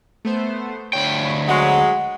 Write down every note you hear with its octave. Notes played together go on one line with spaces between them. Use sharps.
A3 B3 C5
D2 C#5 G5 B5
F#3 G#3 F#5 C#6